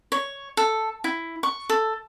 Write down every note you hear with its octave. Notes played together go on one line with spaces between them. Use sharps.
C#5
A4
E4
C#6
A4